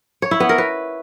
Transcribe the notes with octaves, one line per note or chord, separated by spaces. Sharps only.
C#5
E4
B3
A#4
B4